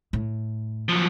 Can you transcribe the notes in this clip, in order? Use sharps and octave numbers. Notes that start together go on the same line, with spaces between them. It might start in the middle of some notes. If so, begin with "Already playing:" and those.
A2
F3 F#3